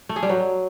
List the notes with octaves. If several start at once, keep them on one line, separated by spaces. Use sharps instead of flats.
A3
G#4
G3
F#3